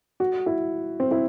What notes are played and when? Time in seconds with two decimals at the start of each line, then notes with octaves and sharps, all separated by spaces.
0.20 F#4
0.46 E4
1.00 C4
1.11 E4